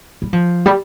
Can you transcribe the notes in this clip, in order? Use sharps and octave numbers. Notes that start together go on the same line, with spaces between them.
G3
F3
G3